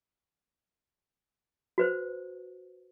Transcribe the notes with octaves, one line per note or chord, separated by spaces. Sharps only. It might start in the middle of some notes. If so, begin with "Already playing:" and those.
F#4 B4 C5